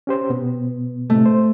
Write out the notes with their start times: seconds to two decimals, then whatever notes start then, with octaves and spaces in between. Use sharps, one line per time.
0.07 C#4 G4 C5
0.30 B2 B3
1.10 A2 C3 A3
1.26 C5